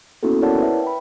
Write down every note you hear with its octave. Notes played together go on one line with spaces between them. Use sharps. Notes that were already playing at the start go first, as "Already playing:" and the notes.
A#3 B3 C#4 E4 F#4 A4
E4 A#4 C#5 D5 F#5 A5
B4 E5
G5 B5